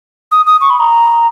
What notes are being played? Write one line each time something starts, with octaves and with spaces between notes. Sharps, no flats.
D#6
D#6
C#6
B5
A#5